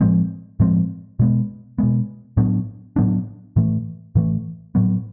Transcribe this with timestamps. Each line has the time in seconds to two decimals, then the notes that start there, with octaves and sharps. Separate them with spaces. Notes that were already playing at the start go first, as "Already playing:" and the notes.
0.01 A2 F3 G#3 C4
0.60 A2 F3 G#3 C4
1.19 B2 G#3 B3
1.78 B2 G#3 B3
2.37 A2 F#3 B3 D4
2.96 A2 F#3 B3 D4
3.56 A2 E3 A3
4.15 A2 E3 A3
4.75 A2 F#3 B3